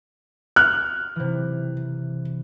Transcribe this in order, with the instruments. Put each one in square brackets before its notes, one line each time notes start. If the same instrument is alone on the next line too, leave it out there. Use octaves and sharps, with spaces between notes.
[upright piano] F6 [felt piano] F#6
[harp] C3 E3